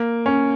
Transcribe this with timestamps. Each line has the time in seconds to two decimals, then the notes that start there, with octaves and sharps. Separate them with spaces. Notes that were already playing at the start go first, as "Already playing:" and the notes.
Already playing: A#3
0.26 C#4